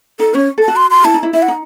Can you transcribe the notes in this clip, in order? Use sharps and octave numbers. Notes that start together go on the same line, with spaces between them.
D#4 A4
C#4 C#5
A4
A5
F#4
C6
C6
E4 A5
D#4
E4
E4 E5
F#5
D#4